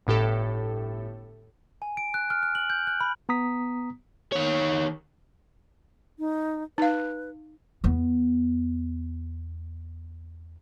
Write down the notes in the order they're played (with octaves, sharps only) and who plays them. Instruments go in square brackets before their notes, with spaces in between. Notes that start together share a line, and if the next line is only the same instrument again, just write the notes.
[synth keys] G1 A2 G4 A4
[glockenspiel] G#5
D7
F#6
F6
F#6
F#7
G6
F#6
B5
[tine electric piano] B3 A#5 D#6 B6
[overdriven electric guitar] D#3 C#5
[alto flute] D#4
[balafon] D#4 F5 [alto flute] B4
[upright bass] E2 B3